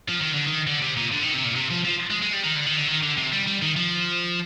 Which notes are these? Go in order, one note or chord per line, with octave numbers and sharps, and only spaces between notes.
F3
D#3
D3
D#3
D3
C3
A#2
D3
D#3
C3
A#2
C3
F3
F3
G#3
G#3
G3
D#3
D3
D#3
D3
D#3
D3
C3
G3
G3
D#3
F3